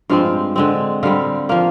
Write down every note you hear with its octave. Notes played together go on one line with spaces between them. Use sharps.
G2 F3 G#3 C4 F5
D3 G#3 C4
D3 G3 C4 F5
F3 A#3 F5